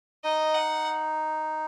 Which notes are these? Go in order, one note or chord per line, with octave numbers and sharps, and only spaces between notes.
D#4 D#5
F#5